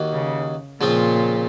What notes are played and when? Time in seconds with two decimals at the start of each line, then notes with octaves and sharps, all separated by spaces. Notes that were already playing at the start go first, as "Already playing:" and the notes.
Already playing: D#2 D#3 A#3 F#4
0.12 C#3
0.81 A#2 C#3 F3 C4 F4